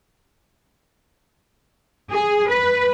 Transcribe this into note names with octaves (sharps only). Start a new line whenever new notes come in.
G#4
B4